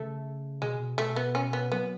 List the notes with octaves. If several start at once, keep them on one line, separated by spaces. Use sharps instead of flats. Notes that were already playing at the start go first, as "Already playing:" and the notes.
Already playing: C#3 A3
B2 G#3
B2
B2 A3
B3
C#4
B3
F#3 B3